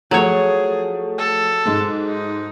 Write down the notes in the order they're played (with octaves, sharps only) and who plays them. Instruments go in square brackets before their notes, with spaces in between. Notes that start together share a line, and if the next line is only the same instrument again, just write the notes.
[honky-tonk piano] F3 A3 [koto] F#3 C#5 [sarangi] G#4
[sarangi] A4
[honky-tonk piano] G#2 G#3
[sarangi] D#4